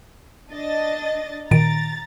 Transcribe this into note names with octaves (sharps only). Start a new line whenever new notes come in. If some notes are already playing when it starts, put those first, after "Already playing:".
D4 D#5 A6
A#2 D#3 A#5 A6 D7